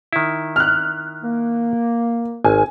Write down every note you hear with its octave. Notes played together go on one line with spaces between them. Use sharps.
D#3 E4
F6 F#6
A#3
G#1 G#5